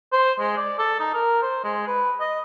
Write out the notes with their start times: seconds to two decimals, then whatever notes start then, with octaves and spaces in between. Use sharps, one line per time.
0.12 C5
0.40 G#3
0.57 D5
0.79 A4
1.00 D#4
1.14 A#4
1.42 C5
1.64 G#3
1.87 B4
2.20 D#5